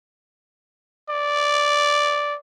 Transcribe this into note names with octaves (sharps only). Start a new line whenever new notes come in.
D5